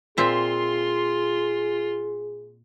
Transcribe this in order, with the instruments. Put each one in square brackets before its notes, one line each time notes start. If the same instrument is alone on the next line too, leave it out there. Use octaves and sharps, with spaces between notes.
[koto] A#2 C4 E5 [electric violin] F4 C6 [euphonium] G#4